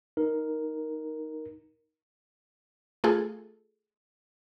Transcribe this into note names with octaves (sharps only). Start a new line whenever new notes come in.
D#4 A#4
A3 F4 G#4 A4